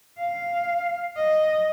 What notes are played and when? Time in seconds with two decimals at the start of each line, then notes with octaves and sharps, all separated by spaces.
0.18 F5
1.17 D#5